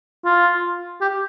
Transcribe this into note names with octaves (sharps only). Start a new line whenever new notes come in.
F4
G4